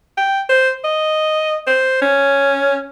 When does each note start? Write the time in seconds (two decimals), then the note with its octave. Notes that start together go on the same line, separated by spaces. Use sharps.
0.17 G5
0.50 C5
0.84 D#5
1.67 C5
2.02 C#4